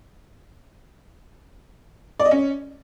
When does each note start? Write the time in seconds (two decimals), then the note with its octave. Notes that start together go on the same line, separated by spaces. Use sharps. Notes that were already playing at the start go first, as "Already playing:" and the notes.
2.20 D5
2.25 D#5
2.31 C#4